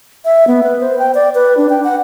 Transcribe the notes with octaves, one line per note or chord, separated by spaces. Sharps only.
E5
B3
B4
C5
G5
D5
B4
D4
G5
F#5